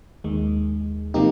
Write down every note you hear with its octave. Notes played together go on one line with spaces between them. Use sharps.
D#2 D#3 G#3
C3 F3 A#3 D#4 G4